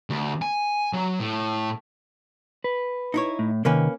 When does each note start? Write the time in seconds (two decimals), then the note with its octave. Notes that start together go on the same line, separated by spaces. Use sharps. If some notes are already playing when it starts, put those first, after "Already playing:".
0.10 D2
0.42 G#5
0.93 F#3
1.20 A2
2.64 B4
3.14 D#4 E4 C#5
3.39 A2
3.65 C3 D#3 A#3 C#4 B4